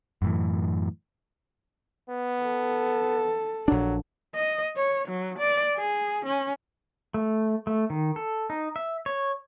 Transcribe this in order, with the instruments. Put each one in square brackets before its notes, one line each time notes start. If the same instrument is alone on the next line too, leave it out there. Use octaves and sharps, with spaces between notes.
[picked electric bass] F#2 A2 E3
[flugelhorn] B3
[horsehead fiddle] A4
[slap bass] A#1 D4 [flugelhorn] F#3
[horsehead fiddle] D#5
C#5
F#3
D5
G#4
C#4
[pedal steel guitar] A3
A3
D#3
A4
D#4
E5
C#5